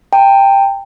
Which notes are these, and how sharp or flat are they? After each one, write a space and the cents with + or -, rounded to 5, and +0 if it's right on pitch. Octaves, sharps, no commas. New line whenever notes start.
G5 +10 A#5 -45